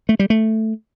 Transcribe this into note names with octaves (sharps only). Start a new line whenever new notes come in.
A3
G3
A3